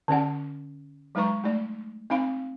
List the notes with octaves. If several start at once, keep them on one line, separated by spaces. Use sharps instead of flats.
D3 C#4 D5 F#5
F#3 G#3 D#4 B4 A#5 C#6
A3 D#4 D5
C4 D#4 F5 B5